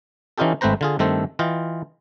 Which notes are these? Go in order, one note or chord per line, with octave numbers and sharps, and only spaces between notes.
E3 C#4 D#4 F4 G4 A4
G#1 A3 C4 B4 C5 A#5
D3 F4 G#4
G2 D#3 A3 C4 A4 C5
E3 F4 D#5 G5